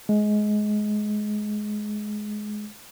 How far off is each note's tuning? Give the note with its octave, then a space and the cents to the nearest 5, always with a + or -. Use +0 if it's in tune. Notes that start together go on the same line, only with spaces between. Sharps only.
G#3 +20